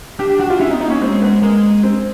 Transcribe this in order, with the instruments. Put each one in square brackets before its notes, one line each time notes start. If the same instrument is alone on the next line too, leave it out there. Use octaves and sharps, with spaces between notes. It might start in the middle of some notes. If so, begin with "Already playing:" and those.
[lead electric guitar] D4 [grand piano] G4
[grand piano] G4
[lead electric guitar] D4 [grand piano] F#4
[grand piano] F4
[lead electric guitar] C#4 [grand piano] E4
[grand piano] D#4
[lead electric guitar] B3
[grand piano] D#4
[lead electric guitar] A#3 [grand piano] C#4
[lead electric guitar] G#3 [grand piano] C4
[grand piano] B3
[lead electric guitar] G#3 [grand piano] A#3
[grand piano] C4